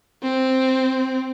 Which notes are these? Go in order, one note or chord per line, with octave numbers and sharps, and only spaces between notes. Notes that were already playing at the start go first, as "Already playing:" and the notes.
C4